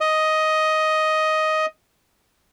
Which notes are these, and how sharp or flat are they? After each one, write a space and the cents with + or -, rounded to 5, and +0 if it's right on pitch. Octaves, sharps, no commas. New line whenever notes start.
D#5 +10